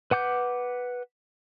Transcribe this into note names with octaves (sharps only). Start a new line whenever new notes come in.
B4 F#5 D6 G6